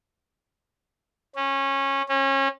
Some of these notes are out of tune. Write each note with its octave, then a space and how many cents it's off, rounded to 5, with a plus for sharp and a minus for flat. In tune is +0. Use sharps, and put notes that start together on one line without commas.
C#4 -20
C#4 -30